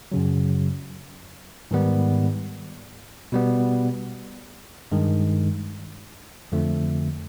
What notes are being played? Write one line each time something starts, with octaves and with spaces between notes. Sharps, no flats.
F#2 C#3 F#3
G#2 D#3 G3 B3
B2 G3 B3
G2 D#3 G#3
F2 D3 F3 A3